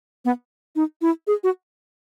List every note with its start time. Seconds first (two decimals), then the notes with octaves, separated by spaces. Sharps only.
0.25 B3
0.76 D#4
1.02 E4
1.27 G#4
1.44 F#4